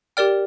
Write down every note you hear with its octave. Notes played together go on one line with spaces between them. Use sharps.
G4 A#4 D5 G5 F6